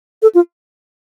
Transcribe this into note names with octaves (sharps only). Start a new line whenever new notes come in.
A4
F4